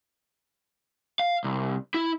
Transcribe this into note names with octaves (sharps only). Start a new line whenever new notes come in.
F5
C2
E4